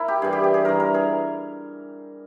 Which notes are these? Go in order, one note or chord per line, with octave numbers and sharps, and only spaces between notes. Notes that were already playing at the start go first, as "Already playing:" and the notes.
Already playing: E4 A#4
G4
G2 E3 G#4
G4
G4
G#4
G2 E3 A#4
A#4
G#4